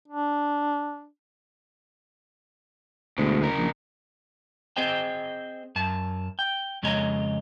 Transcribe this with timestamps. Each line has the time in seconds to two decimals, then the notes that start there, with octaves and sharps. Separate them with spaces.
0.08 D4
3.18 D2 B2 G#3
3.42 C#3 A#4
3.58 A#1
4.77 C4 G#4 C5 D#5 G5
5.76 F#2 A5
6.39 G5
6.83 F2 C#3 G#3 C#5 D#5 A#5